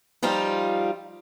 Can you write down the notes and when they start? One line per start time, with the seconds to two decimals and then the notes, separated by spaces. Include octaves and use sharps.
0.23 F3 G3 D#4 F4